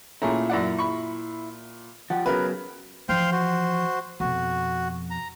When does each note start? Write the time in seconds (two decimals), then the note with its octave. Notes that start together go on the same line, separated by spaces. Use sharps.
0.22 A#2 A3 C#4 E4 G#4 A#5
0.50 F#2 D5 F#5
0.79 B5 C#6
2.10 F3 G4 F#5
2.26 C#3 F#3 B3 A#4 B4
3.09 E3 F3 C5 F5 G5
3.32 F#4 C5
4.20 F2 B2 F#4
5.10 A#5